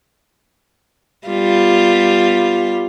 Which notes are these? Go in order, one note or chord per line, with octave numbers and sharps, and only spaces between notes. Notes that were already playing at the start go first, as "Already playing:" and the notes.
G3 B3 F4